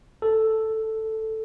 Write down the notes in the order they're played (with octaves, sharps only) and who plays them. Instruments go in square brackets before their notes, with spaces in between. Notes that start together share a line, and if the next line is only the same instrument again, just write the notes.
[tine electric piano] A4